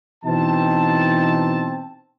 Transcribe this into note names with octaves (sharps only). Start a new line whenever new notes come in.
B2 E3 C4 D#4 A5